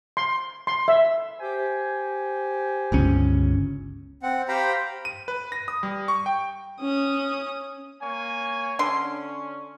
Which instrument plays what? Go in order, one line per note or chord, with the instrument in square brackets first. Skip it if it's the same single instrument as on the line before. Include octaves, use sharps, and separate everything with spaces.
[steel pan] C6
C6
E5
[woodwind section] G4 C5 G#5
[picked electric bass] G1 C#2 C#4
[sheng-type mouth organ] C4 F#5
G4 C5 F5 G5 A#5 B5
[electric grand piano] D#7
B4
A#6
D#6
G3
C#6
G5
[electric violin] C#4 D#6
[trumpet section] A#3 C#5 G#5
[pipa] D3 C6 [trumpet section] C#4